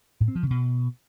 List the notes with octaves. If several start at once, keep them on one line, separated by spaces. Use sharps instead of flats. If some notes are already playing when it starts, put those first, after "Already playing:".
A2
C4
F3
C#3
B2